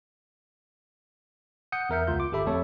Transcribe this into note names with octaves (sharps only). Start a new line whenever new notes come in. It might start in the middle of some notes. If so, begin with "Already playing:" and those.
F#5 D#6 G6 C#7
E2 A#4 E5 G6
C#2 F4 G6
D6
G1 G4 A4 E5 B5
F2 A3 A4 C#5